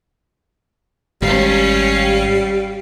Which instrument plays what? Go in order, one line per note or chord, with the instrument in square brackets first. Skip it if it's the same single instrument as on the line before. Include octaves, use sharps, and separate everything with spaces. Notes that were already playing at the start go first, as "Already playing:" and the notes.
[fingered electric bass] G#1 [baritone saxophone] G3 [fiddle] C#4 F5